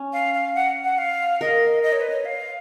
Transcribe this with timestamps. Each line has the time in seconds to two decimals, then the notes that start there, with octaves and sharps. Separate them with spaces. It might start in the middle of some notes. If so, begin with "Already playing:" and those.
Already playing: C#4
0.13 F5
0.34 F5
0.55 F#5
0.84 F#5
0.98 F5
1.41 A#4 D#5
1.83 D#5
1.93 C#5
2.01 B4
2.10 C#5
2.25 F5